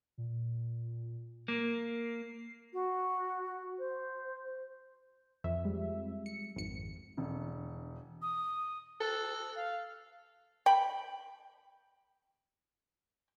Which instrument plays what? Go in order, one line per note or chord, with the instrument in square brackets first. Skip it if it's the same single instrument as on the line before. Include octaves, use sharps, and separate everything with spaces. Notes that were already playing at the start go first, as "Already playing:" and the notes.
[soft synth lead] A#2
[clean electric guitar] A#3 [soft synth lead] C7
[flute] F#4
C5
[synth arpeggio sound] F2 E5
[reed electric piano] G3 G#3
[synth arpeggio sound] C#7
[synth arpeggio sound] G#1 C#7 [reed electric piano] F2
[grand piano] E1 D3
[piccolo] D#6
[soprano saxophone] A4 [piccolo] F#6
[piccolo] F5
[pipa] G5 B5